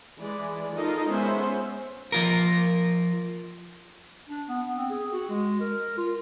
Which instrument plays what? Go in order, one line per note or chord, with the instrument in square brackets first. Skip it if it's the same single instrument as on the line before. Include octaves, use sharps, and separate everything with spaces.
[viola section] E3 G#3 D5
D#4 F4 A4 A#4 D#5
G#3 B3 C#4 C5 E5
[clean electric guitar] F3 F4 A#4
[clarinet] D4
B3
C4
G#4
F#4
G#3
A#4
F4